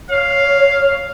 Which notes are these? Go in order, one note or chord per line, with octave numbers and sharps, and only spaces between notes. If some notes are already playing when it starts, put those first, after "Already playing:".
C#5 F5